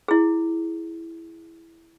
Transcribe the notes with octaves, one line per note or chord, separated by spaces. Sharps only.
E4 G#4